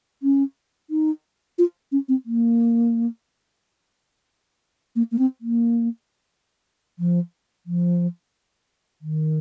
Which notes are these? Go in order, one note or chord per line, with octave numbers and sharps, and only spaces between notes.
C#4
D#4
F4
C#4
C4
A#3
A#3
A#3
C4
A#3
F3
F3
D#3